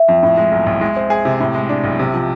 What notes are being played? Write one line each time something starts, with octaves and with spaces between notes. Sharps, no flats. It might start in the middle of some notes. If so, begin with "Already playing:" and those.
Already playing: E5
F2
A2 E5
G#3
B1
B1
G#3
C4
G#4
C3
A2
G#3
D4
B1
C3
F3